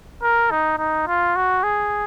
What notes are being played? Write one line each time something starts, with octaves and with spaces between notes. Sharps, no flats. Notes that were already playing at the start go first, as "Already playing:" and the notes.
A#4
D#4
D#4
F4
F#4
G#4